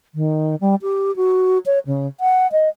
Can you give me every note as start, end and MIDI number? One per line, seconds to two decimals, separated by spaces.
0.15 0.56 51
0.61 0.75 55
0.82 1.14 67
1.16 1.58 66
1.66 1.79 73
1.86 2.07 49
2.20 2.50 78
2.52 2.69 75